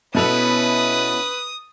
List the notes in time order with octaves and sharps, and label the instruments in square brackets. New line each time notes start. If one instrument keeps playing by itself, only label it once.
[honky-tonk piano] B2 A4 [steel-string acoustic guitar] B3 C#4 E4 [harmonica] B4 [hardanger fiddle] D#6